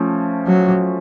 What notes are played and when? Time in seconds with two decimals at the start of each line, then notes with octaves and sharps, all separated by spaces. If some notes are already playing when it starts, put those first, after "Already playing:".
Already playing: F3 A3 C#4
0.46 F#3